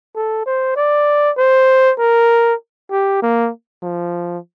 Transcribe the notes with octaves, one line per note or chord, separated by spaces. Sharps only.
A4
C5
D5
C5
A#4
G4
A#3
F3